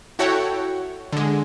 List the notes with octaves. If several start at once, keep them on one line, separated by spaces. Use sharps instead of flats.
E4 F#4 A4 C#5 F#5 G5
D3 G#3